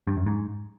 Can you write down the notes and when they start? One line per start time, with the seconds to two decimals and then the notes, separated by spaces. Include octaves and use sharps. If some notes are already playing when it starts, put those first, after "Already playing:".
0.07 G2
0.17 F#2
0.26 G#2